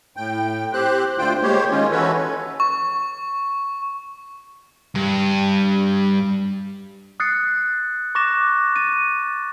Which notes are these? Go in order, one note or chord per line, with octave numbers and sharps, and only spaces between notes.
A2 G5
C4 G4 C5 F#6
D2 D3 F4 C5 G5
G#3 A#3 G4 C5 C#5
D#3 G#3 C#4 F4
E3 C#4 F#4 A4 B4 C#5
C#6
G2
D#6 F6 F#6 A6 C7 C#7
C#6 D6 F#6 A6 A#6 E7
A6 D#7